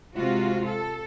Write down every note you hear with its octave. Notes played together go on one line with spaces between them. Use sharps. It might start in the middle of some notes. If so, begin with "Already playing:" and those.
C3 G#3 F4 F#4
A4